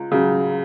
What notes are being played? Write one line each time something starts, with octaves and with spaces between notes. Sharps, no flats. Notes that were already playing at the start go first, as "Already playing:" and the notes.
Already playing: C#2
C#3 F#3